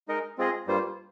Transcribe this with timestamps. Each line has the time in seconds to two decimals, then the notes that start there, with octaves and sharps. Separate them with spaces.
0.08 G#3 D#4 A#4 D#5
0.38 G#3 C4 F4 G#4 D#5
0.67 G2 G3 A#3 F4 C5